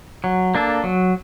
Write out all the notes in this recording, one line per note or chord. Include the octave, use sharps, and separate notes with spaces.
F#3
A#3 D4 A4
F#3